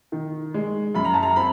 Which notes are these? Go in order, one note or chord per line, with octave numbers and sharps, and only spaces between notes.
D#3
G#3
F#2 B5
A#5
A5
A#5
C4 B5